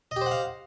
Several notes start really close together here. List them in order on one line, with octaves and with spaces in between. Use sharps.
D#5 G4 C5 F#5 F5